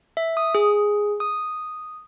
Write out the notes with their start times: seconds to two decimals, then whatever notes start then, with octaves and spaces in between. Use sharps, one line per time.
0.17 E5
0.37 D#6
0.55 G#4
1.20 D#6